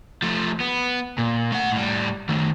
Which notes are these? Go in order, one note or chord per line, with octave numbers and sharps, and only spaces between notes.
F3 A3
B3
A#2
A3 F#5
A2 G3
D#3 A3